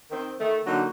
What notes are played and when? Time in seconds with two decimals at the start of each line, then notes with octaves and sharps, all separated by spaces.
0.11 D#3 C4
0.40 D#3 A3
0.66 D3 F#3 A#3 D#4